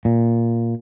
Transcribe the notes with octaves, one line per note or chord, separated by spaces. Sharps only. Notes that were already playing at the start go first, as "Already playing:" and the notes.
A#2